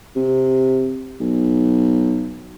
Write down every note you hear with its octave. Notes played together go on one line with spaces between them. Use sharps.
C3
B1